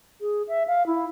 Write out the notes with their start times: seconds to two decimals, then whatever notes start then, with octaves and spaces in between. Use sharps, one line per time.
0.21 G#4
0.48 E5
0.67 F5
0.86 E4